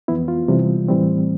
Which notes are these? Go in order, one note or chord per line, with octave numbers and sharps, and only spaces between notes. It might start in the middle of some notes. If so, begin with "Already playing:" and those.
F2 E3 B3 E4
F4
C3 E3 G3
A2 E3 G3 C4